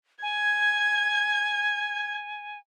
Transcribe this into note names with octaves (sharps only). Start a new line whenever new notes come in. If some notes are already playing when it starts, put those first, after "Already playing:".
G#5 G#6